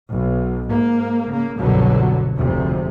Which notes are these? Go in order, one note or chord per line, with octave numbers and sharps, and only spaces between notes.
B1
G#2 A#3
C#3 A#3
G1 C2 B2 D3 F#3
F1 D2 G#2 C3